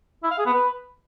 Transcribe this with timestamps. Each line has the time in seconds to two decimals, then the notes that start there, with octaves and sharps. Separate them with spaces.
0.24 E4
0.31 F5
0.39 G#4
0.46 B3
0.54 B4